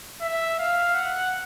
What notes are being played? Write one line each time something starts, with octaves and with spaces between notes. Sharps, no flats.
E5
F5
F#5